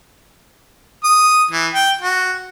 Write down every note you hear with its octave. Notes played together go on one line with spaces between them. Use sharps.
D#6
E3
G5
F#4